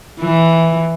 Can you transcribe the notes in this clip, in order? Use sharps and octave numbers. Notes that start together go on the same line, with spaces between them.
E3